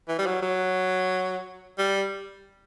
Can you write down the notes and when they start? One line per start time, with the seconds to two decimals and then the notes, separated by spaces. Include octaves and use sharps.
0.08 E3
0.19 G3
0.26 F#3
0.42 F#3
1.78 G3